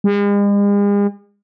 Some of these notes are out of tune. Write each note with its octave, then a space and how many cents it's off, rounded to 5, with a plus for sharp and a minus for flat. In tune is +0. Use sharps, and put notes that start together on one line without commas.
G#3 -45